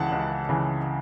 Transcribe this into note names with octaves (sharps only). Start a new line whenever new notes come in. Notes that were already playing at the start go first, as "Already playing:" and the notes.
Already playing: C#2 C#3 E3 F#5 A5
C#2
C#3 E3